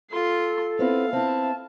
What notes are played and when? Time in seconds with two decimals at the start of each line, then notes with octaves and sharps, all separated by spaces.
0.11 F4 A4 C6
0.79 B3 C4 E4 F5
1.13 C4 E4 A5